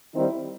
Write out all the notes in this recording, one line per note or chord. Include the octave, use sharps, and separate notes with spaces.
D#3 G3 C4 D#4 E4